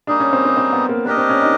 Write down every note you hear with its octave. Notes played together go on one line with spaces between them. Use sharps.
G3 A#3 D4 D#4 G#4
C#4
C4
C4
C4
B3
A#3
A#3 D4 G4 A#4 D#5
C4
C#4
D#4